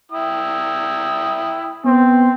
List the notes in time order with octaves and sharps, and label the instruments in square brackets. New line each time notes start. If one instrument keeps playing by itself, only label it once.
[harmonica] E4 G5 D#6
[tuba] B3 [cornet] C4